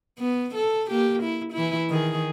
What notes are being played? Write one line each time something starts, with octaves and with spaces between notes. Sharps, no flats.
B3
A4
A#3 G4
E4
E3 E4
D#3 G#4